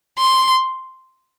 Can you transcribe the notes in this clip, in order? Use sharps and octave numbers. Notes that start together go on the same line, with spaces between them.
C6